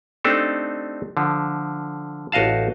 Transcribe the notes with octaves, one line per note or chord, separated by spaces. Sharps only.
A3 C4 D4 D#4 G4 A4
D3 F3
A1 F#4 D#5 F5 A5